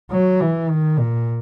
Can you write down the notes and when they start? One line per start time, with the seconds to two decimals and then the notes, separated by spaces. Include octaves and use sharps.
0.11 F#3
0.40 E3
0.70 D#3
0.98 A#2